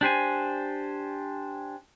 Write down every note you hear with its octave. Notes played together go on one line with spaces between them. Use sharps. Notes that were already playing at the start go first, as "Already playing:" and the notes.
D4 G4 C5 G#5